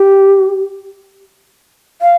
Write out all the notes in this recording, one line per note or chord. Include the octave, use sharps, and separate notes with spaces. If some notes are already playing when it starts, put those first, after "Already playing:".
Already playing: G4
F5